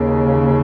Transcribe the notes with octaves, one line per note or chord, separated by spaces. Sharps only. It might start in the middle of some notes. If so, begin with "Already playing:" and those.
Already playing: D#2 C#3